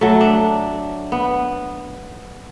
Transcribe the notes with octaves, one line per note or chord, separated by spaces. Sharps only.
F#3 A3
D4
B3